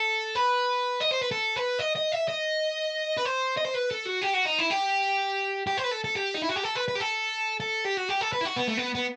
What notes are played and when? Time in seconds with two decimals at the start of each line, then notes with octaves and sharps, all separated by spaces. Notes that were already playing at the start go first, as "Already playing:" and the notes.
Already playing: A4
0.35 B4
1.01 D#5
1.11 C5
1.22 B4
1.31 A4
1.56 B4
1.79 D#5
1.96 D#5
2.12 E5
2.29 D#5
3.17 B4
3.25 C5
3.57 D#5
3.65 C5
3.74 B4
3.90 A4
4.05 F#4
4.22 G4
4.33 F#4
4.45 D#4
4.59 E4
4.71 G4
5.67 G4
5.78 C5
5.84 B4
5.91 A4
6.04 A4
6.15 G4
6.34 D#4
6.42 E4
6.49 F#4
6.56 G4
6.64 A4
6.75 B4
6.88 B4
6.95 G4
7.00 A4
7.60 A4
7.85 G4
7.97 F#4
8.09 G4
8.21 A4
8.33 B4
8.41 E4
8.45 F#4
8.56 B3
8.67 A3
8.77 B3
8.95 B3